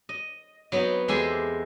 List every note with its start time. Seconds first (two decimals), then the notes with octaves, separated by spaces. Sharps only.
0.09 D#5
0.72 F#3 B3 C4 D#4
1.08 E2 G#3 G4 A4 C5 G#5